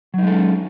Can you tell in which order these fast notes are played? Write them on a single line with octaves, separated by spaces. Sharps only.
F#3 D#4 G#3 A4 C#4